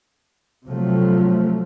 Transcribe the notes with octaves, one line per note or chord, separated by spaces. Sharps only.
C3 F3 F#3 A3